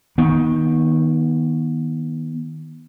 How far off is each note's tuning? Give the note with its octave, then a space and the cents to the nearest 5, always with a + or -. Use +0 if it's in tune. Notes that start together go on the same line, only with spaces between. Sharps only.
D#3 +15 B3 -30